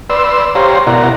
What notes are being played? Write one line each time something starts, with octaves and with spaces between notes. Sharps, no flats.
B4 D5 C6 E6
G4 C5 C#5 F5 A#5 C6
B2 E4 A#4 D5 F#5 A#5